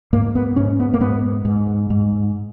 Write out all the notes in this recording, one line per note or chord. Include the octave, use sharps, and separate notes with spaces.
G#2 A#3
B3
G#2 C#4
B3
A#3
G#2 B3
G#2
G#2